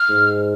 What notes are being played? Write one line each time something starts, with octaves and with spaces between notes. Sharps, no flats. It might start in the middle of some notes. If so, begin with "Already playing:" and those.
Already playing: F6
G#2